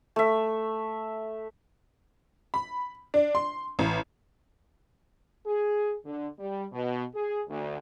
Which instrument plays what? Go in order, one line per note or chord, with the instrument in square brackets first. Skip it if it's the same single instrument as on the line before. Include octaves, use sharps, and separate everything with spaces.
[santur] A3 E5
[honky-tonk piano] B5
D4
C6
A1
[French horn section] G#4
D3
G3
B2
G#4
D2